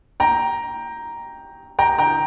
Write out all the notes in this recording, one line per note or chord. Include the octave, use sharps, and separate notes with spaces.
G5 A#5
G5 A#5
G5 A#5